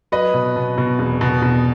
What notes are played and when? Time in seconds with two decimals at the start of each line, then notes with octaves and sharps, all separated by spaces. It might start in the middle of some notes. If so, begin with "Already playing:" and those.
0.12 F#3 B4 D#5
0.34 B2
0.56 B2
0.78 B2
0.99 E1
1.21 B2
1.42 B2